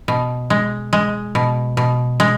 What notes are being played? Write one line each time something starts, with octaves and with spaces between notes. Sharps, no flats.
B2
G#3
G#3
B2
B2
G#3